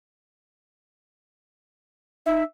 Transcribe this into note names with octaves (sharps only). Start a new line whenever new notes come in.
D#4 E5